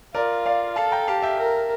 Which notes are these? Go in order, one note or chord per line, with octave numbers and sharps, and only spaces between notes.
F4 A#4 D5
D5 F5
A4 F5 A5
G5 A#5
G4 F5 A5
E5 G5
A#4